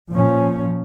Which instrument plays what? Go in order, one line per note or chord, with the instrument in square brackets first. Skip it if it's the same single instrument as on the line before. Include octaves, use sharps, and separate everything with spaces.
[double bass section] A#2 F3 C#4